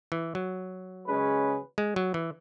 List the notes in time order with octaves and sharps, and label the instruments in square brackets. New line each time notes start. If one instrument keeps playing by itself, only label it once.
[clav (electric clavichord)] E3
F#3
[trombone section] C#3 G#3 C#4 G#4 B4
[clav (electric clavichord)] G#3
F#3
E3